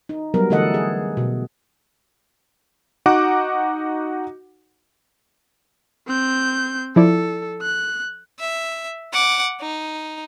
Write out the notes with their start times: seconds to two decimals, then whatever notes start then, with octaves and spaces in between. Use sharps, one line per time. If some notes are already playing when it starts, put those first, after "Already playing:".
0.09 D#4
0.34 F#3 G3 B3 A#4
0.50 D3 E3 A3 A4 D#5 F#5
0.74 G#4
1.17 B2
3.06 D#4 F#4 F#5 D6
6.07 C4 G6
6.96 F3 E4 A4 D5
7.62 F#6
8.39 E5
9.13 F#5 D6
9.60 D#4